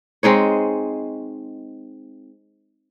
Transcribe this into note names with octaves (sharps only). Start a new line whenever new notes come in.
G#3 C4 D#4 C#5